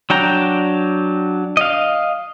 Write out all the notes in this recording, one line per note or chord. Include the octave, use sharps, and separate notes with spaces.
F#3 D4 G5 A#5
D#5 F5